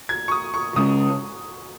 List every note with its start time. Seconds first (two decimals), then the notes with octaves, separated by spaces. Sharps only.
0.09 G#6
0.28 C#6
0.31 D#6
0.54 C#6
0.76 C#3 G#3 C#4 D#6